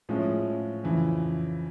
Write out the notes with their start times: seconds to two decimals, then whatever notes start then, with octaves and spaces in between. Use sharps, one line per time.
0.09 A2 F3 G#3 C#4
0.84 F2 C#3 E3